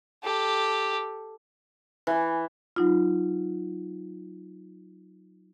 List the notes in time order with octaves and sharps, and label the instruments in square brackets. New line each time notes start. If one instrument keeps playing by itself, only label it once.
[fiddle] G4 A4
[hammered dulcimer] E3
[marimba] F#3 D#4 F4